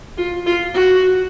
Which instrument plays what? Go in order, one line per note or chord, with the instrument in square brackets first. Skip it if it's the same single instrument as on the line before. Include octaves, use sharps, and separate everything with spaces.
[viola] F4
F4
F#4